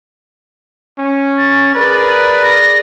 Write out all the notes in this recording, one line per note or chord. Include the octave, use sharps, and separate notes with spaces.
C#4
A6
G#4 A#4 B4 D5
A#6